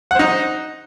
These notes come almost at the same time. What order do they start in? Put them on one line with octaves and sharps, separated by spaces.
F#5 C5 D#4